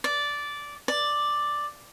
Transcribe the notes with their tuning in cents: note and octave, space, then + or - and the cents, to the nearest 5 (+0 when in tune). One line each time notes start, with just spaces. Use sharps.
D5 -10
D5 +5